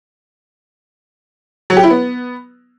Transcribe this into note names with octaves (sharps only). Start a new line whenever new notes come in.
F#3
G4
E4
B3